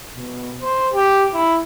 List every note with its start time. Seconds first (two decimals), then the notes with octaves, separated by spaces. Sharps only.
0.17 B2
0.62 C5
0.93 G4
1.34 E4